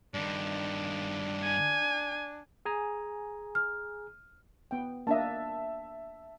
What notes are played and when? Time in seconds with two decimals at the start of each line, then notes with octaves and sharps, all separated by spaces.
0.14 G2 D#3 D4
1.43 G#5
2.65 G#4 G#5 A#5
3.55 F6
4.71 B3 G5
5.07 A#3 D4 D#5 E5 A5